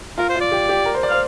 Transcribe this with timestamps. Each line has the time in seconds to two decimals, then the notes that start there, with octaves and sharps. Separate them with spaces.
0.18 F4 A#4
0.29 C5
0.35 F4
0.41 D5
0.52 G4
0.69 G4
0.86 A#4
0.95 C5
1.03 D5
1.09 C5 F5